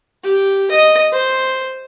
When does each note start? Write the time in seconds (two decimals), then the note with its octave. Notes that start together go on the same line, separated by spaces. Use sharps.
0.23 G4
0.71 D#5
1.13 C5